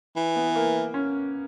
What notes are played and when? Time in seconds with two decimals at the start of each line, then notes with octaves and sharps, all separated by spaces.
0.16 E3
0.36 B3
0.56 A#3
0.94 C#4